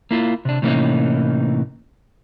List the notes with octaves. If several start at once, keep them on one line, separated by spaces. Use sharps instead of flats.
A#3 E4 F4
C3 D4
A2 C3 E3 A#3 C#4 D#4